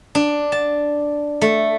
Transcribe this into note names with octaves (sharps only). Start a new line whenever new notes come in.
D4
A5
A3